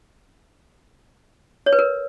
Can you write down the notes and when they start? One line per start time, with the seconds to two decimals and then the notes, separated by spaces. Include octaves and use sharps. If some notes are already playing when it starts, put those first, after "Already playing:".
1.66 C#5
1.73 B4
1.79 A#4